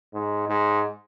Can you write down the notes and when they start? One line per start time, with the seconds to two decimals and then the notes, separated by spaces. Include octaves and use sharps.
0.14 G#2
0.47 G#2